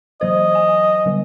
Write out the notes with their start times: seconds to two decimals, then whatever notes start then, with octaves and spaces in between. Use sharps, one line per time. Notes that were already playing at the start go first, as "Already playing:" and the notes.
0.21 E3 F#3 C5 D#5
0.55 G#5
1.06 D3 G3